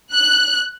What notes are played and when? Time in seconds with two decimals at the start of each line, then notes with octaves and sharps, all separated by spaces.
0.13 F#6